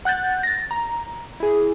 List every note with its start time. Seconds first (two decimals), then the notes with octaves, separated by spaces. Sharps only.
0.05 F#5 F#6 G6 A6
0.43 A6 A#6
0.71 A#5
1.40 E4 G#4